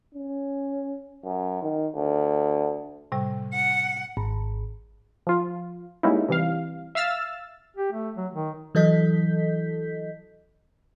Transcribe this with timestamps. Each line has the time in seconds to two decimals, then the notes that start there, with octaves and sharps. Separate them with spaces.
0.14 C#4
1.25 F#2
1.62 D#3
1.96 D2
3.12 A2 C3 G3
3.53 F#5
4.17 G#1
5.27 F3 F4
6.03 G3 G#3 A#3 C#4 D#4 E4
6.29 C3 E3 G3 F5
6.95 E5 F5 E6 F6 A6
7.77 G4
7.92 A3
8.17 F#3
8.34 D#3
8.75 E3 F#3 A4 D#5 G6 B6